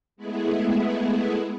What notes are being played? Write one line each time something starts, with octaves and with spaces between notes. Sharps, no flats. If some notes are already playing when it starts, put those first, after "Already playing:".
G#3 A3 B3 E4 G#4